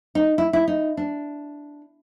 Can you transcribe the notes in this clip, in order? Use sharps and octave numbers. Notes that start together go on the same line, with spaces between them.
D#4
E4
E4
D#4
D4